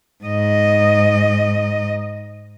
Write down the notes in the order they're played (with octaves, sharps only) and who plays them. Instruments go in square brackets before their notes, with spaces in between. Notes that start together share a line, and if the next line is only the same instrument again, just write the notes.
[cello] G#2 D#5